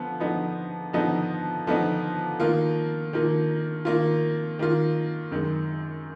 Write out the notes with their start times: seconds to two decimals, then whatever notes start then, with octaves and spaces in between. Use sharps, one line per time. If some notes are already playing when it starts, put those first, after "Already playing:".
Already playing: D3 F3 B3
0.20 D3 F3 B3 D#4
0.93 D3 F3 B3 D#4
1.67 D3 F3 B3 D#4
2.40 D#3 A#3 F4
3.13 D#3 A#3 F4
3.85 D#3 A#3 F4
4.59 D#3 A#3 F4
5.31 F#2 D#3 G#3